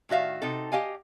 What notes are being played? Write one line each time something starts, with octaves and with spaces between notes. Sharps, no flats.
A2 D#3 F#4 E5 F5
C3 D#4 A4
G4 D#5 F5 G#5